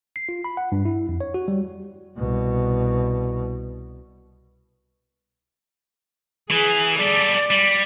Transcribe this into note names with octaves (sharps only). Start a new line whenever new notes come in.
C7
F4
B5
F#5
G2
E4
F2
C#5
F#4
G3
C2 B2
E3 G#4
G3 A4 D5
G3